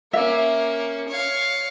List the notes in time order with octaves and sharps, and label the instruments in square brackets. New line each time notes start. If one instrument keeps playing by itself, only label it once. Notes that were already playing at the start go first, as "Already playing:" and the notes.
[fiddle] A#3 C#4 [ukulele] E5
[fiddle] C#5 F5